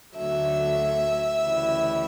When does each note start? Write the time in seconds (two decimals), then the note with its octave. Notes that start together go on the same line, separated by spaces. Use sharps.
0.16 D2 D3 F#3 A3 E5
1.42 D2 C#3 E3 G3